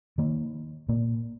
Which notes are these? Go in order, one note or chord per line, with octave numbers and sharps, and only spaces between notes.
D#3 A#3
A#2 A#3